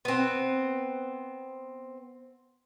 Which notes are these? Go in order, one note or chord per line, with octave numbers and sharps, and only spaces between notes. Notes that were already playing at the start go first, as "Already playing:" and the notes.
B3 C4